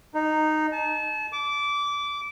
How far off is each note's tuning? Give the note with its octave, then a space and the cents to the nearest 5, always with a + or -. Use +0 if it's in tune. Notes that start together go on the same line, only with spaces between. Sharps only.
D#4 -10
A5 -35
D6 -20